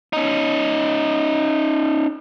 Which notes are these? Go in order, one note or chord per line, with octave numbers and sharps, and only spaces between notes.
C#4 D#4